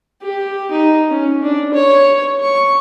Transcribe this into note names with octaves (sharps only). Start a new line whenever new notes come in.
G4
D#4
C#4
D4
C#5
C#6